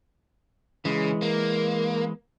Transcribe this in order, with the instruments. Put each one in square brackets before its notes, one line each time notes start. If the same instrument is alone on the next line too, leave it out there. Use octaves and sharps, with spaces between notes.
[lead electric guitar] C#3 [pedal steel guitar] E3 G#3
[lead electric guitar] A#3